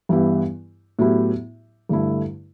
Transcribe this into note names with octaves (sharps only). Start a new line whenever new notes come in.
G2 E3 B3 E4 G4
A2 F#3 B3 E4 G4
G2 D3 A3 E4